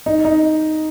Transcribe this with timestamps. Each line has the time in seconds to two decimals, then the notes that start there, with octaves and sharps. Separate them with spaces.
0.06 D#4
0.25 D#4